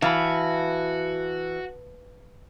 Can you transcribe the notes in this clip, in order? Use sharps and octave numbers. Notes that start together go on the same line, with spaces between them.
E3 F#4 F5 A5 B5